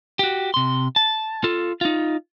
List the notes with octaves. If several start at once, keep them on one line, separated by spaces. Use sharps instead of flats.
F#4 G4
C3 C6
A5
F4 A4
D#4 F4